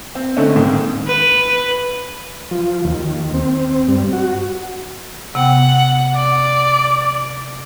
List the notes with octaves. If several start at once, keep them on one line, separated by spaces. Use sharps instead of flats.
C4
D3 A3 C4 C#4 D#4
G#2 D#3 A#3
B4
F3
D#2
C4
G2
F#4
C3 B3 F#5 G5
D5